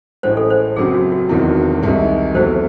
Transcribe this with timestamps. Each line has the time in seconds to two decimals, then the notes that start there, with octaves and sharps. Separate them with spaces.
0.23 A1 A2 G#3 C#4 C5
0.37 A4
0.50 C5
0.76 F#1 F#2 C#3 F#3 C4 G#4
0.95 F#4
1.12 F#4
1.29 E1 E2 C3 D#3 E4
1.82 C2 C3 D#3 G#3
2.35 E1 E2 C3 F#3 A3 C5